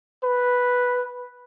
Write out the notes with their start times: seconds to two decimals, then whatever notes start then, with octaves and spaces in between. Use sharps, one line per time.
0.24 B4